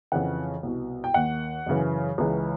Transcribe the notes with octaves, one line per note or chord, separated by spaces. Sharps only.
F2 C#3 E3 F#5
C2 B2
G5
D#2 D#3 F#5
F#2 C#3 E3
C#2 C#3 E3